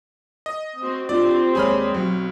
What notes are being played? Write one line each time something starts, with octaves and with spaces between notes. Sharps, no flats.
D#5
C4 F#4
C4 D4 F4 G4 D5
D#2 G#3 G#4 C#5 D5 B5 F6
B1 F#3 C4 F#4